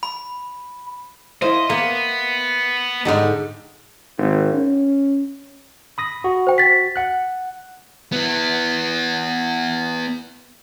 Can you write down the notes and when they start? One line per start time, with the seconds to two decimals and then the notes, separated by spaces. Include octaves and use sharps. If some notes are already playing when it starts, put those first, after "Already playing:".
0.03 B5
1.42 E4 C5 D#5 F5
1.70 A#3 B3
3.05 G#2 D3 D#4 G4 A4 D#5 A5
4.18 G#1
4.53 C#4
5.98 B5 D#6 A#6
6.24 F#4
6.47 C5 G5
6.58 A6 B6
6.96 F#5 F#6
8.12 B3 E4